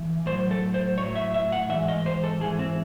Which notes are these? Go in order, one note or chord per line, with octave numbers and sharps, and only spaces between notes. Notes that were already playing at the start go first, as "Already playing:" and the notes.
Already playing: E3
A2 C5
F#3
A4
C5
A2 F#3 C#5
E5
E5
F#5
G#2 E3 E5
D#5
C5
A4
G#2 E3 G#4
C4